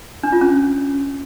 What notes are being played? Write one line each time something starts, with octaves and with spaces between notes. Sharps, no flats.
D4
F4
C#4